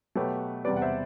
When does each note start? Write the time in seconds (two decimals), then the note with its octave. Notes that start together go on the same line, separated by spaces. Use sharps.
0.16 B2 F#3 A3 G4 B4
0.65 E2 C3 G3 B4 D5
0.77 F#5
0.82 C5 E5